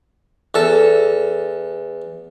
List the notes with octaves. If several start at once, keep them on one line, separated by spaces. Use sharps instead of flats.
E2 A4